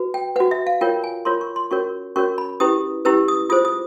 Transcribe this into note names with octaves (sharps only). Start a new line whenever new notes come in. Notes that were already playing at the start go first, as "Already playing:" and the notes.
Already playing: F#4 B4
G5
F#4 B4 F#5
E5
F5
F4 A#4 C#5 G5
G#5
F4 A#4 C#5 C6
C#6
C6
C#4 F#4 A#4 C#5 C#6
C#4 F#4 A#4 C#5 C#6
B5
C#4 E4 G4 B4 D#6
C#4 E4 G4 B4 E6
D#6
F4 G#4 C5 D#6
D#6